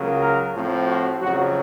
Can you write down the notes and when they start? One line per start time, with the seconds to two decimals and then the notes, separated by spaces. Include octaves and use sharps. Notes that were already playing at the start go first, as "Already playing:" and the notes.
Already playing: C#2 C#3 F#3 A#3
0.20 A#4
0.53 A2 F3 C4
0.87 F#4
1.21 F2 C#3 F#3 F#4